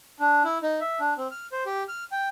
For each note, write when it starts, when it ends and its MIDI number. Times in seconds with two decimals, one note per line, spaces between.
0.20 0.43 62
0.45 0.58 64
0.63 0.80 63
0.81 0.99 76
1.00 1.14 62
1.18 1.28 60
1.31 1.47 89
1.52 1.63 72
1.66 1.84 67
1.88 2.04 89
2.12 2.29 79